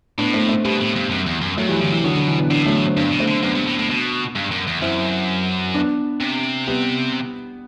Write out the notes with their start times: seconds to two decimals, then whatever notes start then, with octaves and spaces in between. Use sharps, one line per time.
0.18 A2 B3 D4
0.34 A3 C4
0.49 A3 C4
0.65 B2 G3 B3
0.81 A2
0.96 G2
1.10 F#2
1.26 E2
1.41 F#2
1.57 G2 F#3 A3
1.69 E3 G3
1.80 D3 E3
1.92 C3 E3
2.04 B2 D3 F#3
2.15 D3
2.27 E3
2.39 B3 D4
2.50 A2 B3 D4
2.66 F#3 A3
2.87 C4
2.96 G2 B3 D4
3.12 B2
3.19 A3 C4
3.27 D3
3.43 F#2 B3 D4
3.55 G2
3.66 A2
3.78 A2
3.90 B2
4.35 G2
4.51 F#2
4.67 E2
4.81 F#2 C4 E4
5.74 B3 D4
6.20 C3
6.67 G3 B3